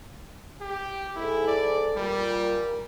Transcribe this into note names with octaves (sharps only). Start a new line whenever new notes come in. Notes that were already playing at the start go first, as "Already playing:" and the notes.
G4
G#2 E4 G#4 A4
D5
A#2 G3 A#4